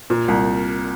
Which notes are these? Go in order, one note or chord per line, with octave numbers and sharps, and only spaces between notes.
A#2
C2